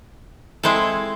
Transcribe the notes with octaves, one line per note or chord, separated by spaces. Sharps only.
G#3 C4 E4 A4